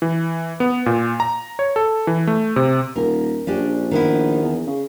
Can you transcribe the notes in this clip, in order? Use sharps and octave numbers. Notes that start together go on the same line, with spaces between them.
E3
B3
A#2
A#5
C#5
A4
E3
A3
C3
D#1 A#4
A#1 C#4 D4 G4
D#3 B3 E4
E2
C#3